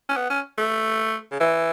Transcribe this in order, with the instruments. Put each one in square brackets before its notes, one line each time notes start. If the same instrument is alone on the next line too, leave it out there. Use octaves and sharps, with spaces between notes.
[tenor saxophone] C#4
B3
C#4
A3
C#3
E3